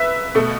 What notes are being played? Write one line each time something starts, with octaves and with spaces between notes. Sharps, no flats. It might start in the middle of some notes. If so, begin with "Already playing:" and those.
Already playing: B4 E5
B2 A3